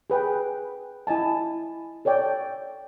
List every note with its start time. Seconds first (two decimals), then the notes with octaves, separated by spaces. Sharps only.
0.10 G#4 B4 G5
1.07 E4 D#5 G#5 A5
2.05 A4 C#5 D5 G5